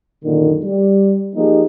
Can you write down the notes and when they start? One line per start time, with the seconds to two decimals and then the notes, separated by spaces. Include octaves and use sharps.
0.24 F#2 A#2 D3 D#3
0.63 G3
1.35 F3 A#3 D#4 G4 G#4